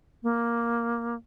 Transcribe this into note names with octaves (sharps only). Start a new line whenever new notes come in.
A#3